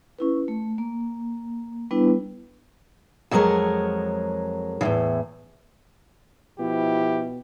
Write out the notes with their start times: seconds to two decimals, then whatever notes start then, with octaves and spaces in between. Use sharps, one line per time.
0.19 C#4 E4 B4
0.48 A3
0.78 A#3
1.91 G3 B3 D4 E4 B4
3.31 F2 F#3 G#3 G#4 A#4 C#5
4.81 E2 A2 C#3
6.59 B2 F3 E4 G4